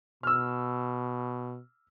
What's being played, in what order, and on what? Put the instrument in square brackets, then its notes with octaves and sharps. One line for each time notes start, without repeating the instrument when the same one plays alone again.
[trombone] B2 [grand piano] E6 F6